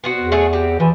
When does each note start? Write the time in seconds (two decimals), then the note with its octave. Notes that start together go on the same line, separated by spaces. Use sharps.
0.04 B3 C4 F#4
0.19 E2
0.32 A3 G#4 C#5
0.53 C4 G4
0.80 E3 F3